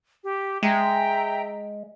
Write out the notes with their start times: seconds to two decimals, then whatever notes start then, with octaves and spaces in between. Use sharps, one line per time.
0.23 G4
0.63 G#3 E5 G5 A#5